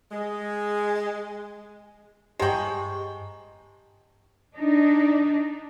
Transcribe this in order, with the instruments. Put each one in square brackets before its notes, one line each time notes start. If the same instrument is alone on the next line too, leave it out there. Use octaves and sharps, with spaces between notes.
[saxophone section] G#3
[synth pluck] G2 A5 A#5 [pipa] G#3 G5 [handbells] G4 C#6
[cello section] D4 D#4